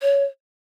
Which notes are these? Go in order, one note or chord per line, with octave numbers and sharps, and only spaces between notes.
C#5